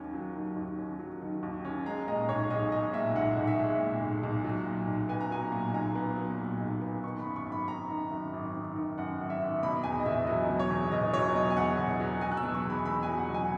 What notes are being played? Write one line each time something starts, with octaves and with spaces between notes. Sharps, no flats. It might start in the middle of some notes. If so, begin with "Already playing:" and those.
Already playing: D#2 D#3 F#3 C#4
F#3
D#3
D#2
C#4
F#3
D#3
D#2
C#4
G#3 A#5
A#2 D#5
B1 C#5
B1 D#5
G#3 D#5
A#2 E5
B1 F#5
B1
E5
G#3
A#2
B1
B1
F#3
A#2
B1
B3 G#5
A#5
F#3 G#5
A#2
B1 A#5
B3
F#3
A#2
B1
B3
D#3 C#6
B5
F#2
C#6
G#1
B5
G#1 A#5
D#3
F#2
G#1
G#1
D#3
F#2 F#5
G#1
E5
G#1
B2 B5
E2 G#5
D#5
E1 E5
F#3 D#5
B2
C#5
E2
E1 D#5
F#3 C#5
B2 D#5
G#5
E2 F#5
E1
F#3
F#3 G#5
F#6
E6
B2
C#6
E2 B5
E2 B5
G#5
F#3
F#5
B2 G#5